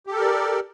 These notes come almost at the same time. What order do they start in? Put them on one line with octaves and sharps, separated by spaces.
G4 A4 A#4 D5